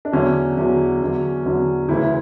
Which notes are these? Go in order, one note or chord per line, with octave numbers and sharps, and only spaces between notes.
D4
E2 D3 F#3 C#4
E2 D3 F#3
E2 D3 F#3
E2 D3 F#3
D2 C#3 E3 E4